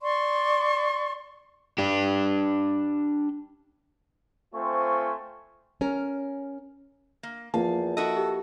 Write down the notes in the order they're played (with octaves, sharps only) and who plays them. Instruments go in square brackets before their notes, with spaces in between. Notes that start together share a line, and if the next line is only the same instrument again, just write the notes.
[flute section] D5 C6 C#6
[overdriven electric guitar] D4 G4
[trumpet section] A3 C4 F4 C5 G#5 C#6
[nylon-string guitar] C#4 A#4
[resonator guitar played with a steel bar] A#3
[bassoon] E2 [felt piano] F3 A#3 [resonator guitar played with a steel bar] F5 [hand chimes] A5
[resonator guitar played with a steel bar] E4 F#4 D#5 [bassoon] A4
[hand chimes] G4